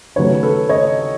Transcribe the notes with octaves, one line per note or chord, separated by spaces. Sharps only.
D#2 C#3 F#3 A3 B4 C#5
A4 B4
C#5 D#5